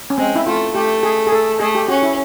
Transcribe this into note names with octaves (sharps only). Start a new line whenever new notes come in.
C#4
G#3 C4
E4
A3 F4
A3 G4
G#4
G#4
A4
A3 G#4
G4
C#4 F#4
E4